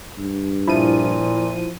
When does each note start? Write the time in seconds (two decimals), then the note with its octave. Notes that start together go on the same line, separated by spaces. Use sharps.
0.18 G2
0.68 A#2 F3 E4 D#7